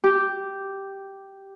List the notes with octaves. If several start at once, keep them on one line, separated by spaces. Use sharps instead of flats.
G4